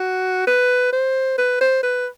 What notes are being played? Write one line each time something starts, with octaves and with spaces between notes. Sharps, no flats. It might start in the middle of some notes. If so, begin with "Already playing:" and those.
Already playing: F#4
B4
C5
B4
C5
B4